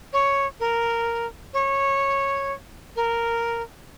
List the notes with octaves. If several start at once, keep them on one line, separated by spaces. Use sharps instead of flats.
C#5
A#4
C#5
A#4